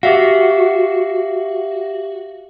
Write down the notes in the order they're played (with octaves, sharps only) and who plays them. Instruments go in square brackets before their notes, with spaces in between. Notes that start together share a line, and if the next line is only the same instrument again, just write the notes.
[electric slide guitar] F#4 [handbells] G4 E5 F5